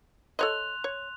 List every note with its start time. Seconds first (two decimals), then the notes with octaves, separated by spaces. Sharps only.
0.39 A4 C#5 D#5 C6 F#6 F7
0.84 C#5